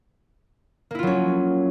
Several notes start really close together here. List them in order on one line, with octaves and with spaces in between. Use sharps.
A#3 E4 F4 F#3 C#4